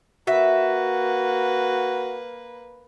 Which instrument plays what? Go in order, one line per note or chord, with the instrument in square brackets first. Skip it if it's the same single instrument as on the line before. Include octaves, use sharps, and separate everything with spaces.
[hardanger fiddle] A#3 B4 [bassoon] F#4 [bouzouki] E5